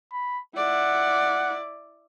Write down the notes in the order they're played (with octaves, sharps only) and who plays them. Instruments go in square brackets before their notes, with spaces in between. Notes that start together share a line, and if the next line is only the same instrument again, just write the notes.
[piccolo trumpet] B5
[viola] E4 D5 [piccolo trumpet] F#5